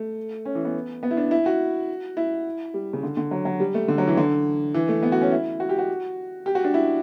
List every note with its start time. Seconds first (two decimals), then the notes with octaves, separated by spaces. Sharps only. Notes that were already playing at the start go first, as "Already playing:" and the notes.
Already playing: A3
0.45 C#4
0.55 E3
0.64 B3
1.03 B3
1.11 E4
1.17 D4
1.31 E4
1.46 F#4
2.17 E4
2.74 G3
2.93 C#3
3.03 D3
3.17 D3
3.31 F#3
3.45 F#3
3.60 G3
3.74 A3
3.88 D3
3.98 F#3
4.07 E3
4.17 D3
4.74 E3
4.89 A3
5.03 B3
5.12 F#4
5.21 C#4
5.32 E4
5.60 F#4
5.69 G4
5.78 F#4
6.46 G4
6.55 F#4
6.64 D4
6.74 E4